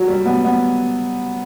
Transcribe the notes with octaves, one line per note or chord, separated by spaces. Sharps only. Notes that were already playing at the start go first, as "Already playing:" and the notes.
Already playing: F#3
G3
B3
B3